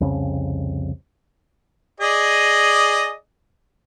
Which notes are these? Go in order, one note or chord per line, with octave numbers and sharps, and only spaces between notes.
C2 F2 C#3 C#4
G#4 D5 D#5